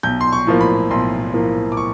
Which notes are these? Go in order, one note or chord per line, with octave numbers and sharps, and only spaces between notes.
B1 G6
C6
C#6
A2 F3 A#3
B5
B1 C6
A2 F3 A#3
D6
C#6